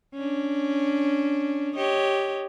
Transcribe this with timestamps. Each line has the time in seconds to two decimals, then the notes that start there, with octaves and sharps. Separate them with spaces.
0.14 C#4 D4
1.74 G4 C#5 D#5